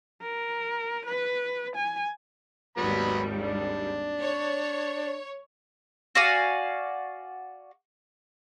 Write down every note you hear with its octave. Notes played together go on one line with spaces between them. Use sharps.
A#4
B4
G#5
G#1 D#2 F#3 G3 B3 B5
D4
C#5
F#4 D5 F5 G#5